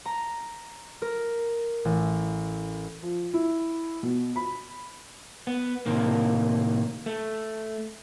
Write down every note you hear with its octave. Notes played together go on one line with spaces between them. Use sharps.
A#5
A#4
A1
F3
E4
B2
B5
B3
A2 C3 D#3 A#3
A3